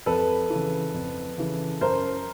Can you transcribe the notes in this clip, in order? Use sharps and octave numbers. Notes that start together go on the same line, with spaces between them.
F2 A4 B4
C#3 E3
F2
C#3 E3
F#2 A#4 C5